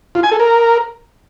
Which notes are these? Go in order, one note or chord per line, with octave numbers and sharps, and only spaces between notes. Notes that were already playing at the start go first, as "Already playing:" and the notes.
F4
G#5
A4
A#4